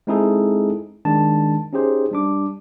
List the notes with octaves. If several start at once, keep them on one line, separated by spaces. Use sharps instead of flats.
G#3 C4 D#4 E4 G#4 A4
D#3 G#3 D4 A5
C#4 D#4 G4 G#4 C5
G3 D4 D6